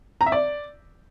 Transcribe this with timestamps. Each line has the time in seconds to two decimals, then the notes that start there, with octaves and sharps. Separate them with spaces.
0.21 A#5
0.26 E5
0.32 D5